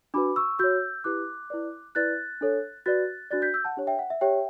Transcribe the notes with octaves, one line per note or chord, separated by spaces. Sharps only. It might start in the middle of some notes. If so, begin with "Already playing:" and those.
D4 F#4 B4 B5 D6
C#6 E6
F#4 C#5 E6 G6
E4 G4 B4 D6 F#6
E4 B4 D5
E4 B4 D5 F#6 A6
D4 A4 C#5
F#4 B4 D5 F#6 A6
D4 F#4 B4 D5 F#6 A6
G6 B6
E6 G6
F#5 A5
D4 G4 C#5
E5 G5
F#5
E5
G4 C#5 E5 G5